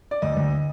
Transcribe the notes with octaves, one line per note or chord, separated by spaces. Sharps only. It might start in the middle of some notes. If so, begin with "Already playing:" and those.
D5
D2 D#5
D2